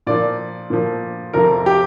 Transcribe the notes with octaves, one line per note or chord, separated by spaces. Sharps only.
A#2 F3 D5
A#2 F3
F2 C3 F3 A#4
G4